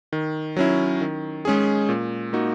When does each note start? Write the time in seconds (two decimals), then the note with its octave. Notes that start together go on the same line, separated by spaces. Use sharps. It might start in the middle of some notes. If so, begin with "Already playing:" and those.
0.13 D#3
0.56 F#3 C#4 E4
1.01 D#3
1.45 G#3 C#4 G#4
1.89 A#2
2.33 A#3 D#4 F#4